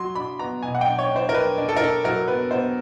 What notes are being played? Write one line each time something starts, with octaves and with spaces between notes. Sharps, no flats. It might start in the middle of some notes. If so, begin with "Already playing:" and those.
Already playing: F#3 C6
D4 B5
B3 A#5
B2 G#5
F#5
G5
D4
C#5
D4 C5
A#4
D4 B4
D4
A4
A#4
D4 A4
F#3 A#4
B3 B4
B3 C5